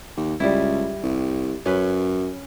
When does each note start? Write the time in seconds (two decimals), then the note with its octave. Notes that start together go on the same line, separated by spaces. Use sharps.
0.17 D#2
0.40 C#2 G3 E4
1.03 C2
1.66 F#2 C#4 B4